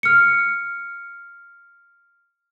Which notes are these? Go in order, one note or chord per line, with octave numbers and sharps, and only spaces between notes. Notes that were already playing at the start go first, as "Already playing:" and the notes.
F6 C#7